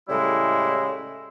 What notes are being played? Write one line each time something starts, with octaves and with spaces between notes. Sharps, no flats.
A2 C#3 G3 G#3 E4